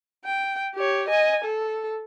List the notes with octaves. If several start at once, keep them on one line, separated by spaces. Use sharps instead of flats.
G5
G4 C#5
D#5 G#5
A4